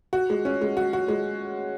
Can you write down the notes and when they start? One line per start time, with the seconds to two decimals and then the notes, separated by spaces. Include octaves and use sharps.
0.13 F#4
0.30 G#3
0.45 C#4
0.61 G#3
0.77 F#4
0.93 F#4
1.08 G#3